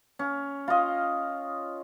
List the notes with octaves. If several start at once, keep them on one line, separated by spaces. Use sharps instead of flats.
C#4
F4 D#5